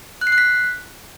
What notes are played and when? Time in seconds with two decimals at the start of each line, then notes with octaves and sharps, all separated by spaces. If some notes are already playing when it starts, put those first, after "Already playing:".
0.21 F#6
0.27 C7
0.32 F#6
0.38 B6